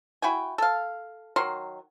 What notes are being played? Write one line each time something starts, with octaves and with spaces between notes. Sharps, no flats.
E4 F#4 G5 G#5
A4 F5
D#3 F#3 A#4 C6